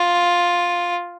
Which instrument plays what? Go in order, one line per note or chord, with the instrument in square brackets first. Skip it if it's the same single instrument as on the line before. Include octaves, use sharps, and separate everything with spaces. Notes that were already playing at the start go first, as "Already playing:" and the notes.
Already playing: [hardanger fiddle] F4